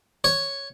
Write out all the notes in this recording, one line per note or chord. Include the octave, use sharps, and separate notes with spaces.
C#5